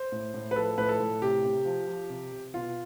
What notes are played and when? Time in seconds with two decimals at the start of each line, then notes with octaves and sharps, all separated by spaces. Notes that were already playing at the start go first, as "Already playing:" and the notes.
Already playing: C5
0.12 A2
0.34 A2
0.51 B4
0.56 F3 A4
0.78 A2 B4
0.89 A4
1.00 A2
1.21 C3 G4
1.44 C3
1.65 F3
1.88 F3
2.10 C3
2.32 C3
2.54 B2 F4